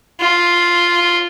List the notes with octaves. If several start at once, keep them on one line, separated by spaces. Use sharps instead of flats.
F4